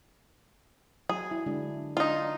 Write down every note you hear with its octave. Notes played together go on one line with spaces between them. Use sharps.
F#3 G#4
E4
D3 G#3 D4
D4 D#4 F4